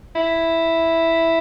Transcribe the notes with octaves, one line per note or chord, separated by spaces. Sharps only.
E4